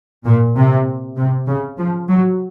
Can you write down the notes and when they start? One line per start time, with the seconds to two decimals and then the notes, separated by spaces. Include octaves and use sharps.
0.25 A#2
0.56 C3
1.17 C3
1.48 C#3
1.78 F3
2.09 F#3